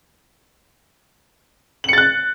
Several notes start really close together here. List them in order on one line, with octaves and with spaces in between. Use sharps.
F#7 C#7 A6 F#6